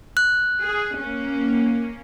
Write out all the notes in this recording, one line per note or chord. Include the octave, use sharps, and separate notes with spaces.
F#6
G#4
A#3 C#4